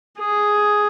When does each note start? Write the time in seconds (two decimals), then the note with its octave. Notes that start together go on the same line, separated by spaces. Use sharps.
0.19 G#4